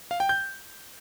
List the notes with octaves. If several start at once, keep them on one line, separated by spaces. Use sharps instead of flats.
F5
G5
G6